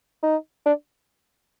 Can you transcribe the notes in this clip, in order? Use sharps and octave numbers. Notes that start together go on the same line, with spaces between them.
D#4
D4